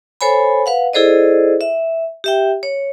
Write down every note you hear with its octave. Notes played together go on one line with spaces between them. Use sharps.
A4 C5 C#5 G#5 B5
B4 F5 F#5
E4 G#4 A4 C5 D5 D#5
E5
G4 E5 G5
C#5